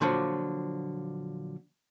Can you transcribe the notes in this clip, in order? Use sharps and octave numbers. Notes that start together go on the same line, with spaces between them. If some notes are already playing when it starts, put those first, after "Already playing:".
A#2 D3 F3 F#3